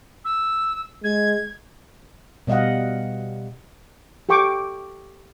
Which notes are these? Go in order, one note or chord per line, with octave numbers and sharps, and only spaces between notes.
E6
G#3 G#6
B2 G3 D#5 F5 F#5
G4 A4 G5 C#6 D6